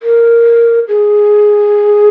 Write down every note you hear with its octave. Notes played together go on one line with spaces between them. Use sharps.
A#4
G#4